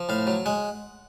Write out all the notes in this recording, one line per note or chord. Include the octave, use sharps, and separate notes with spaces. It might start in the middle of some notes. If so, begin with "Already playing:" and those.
Already playing: F3
A2 F5
F#3
G#3 F#5